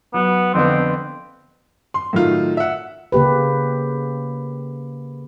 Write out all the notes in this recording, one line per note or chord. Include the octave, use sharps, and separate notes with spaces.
F#3 B3
F2 D3 B3 C4
C6
A2 D#3 F#3 F4
E5 F#5
C#3 A#3 G4 B4